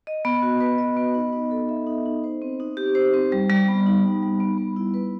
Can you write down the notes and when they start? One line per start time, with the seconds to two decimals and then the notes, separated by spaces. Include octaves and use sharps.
0.07 D#5
0.25 B3
0.42 F#4
0.61 B4
0.78 D#5
0.97 B3
1.14 D#4
1.32 D#4
1.51 A4
1.69 E5
1.87 D#4
2.06 D#4
2.24 C5
2.42 C4
2.60 D#4
2.77 G4
2.95 C5
3.13 C4
3.32 G3
3.50 G3
3.68 B3
3.86 D#4
4.05 G3
4.23 G3
4.40 B3
4.58 B3
4.76 E4
4.94 B4